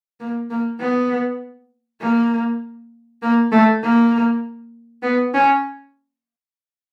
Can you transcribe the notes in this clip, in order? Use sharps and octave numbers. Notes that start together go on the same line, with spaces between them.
A#3
A#3
B3
A#3
A#3
A3
A#3
B3
C#4